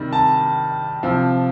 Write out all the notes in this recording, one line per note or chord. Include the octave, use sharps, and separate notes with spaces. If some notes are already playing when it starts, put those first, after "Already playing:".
Already playing: C3 D#3 G3
A5
C3 F3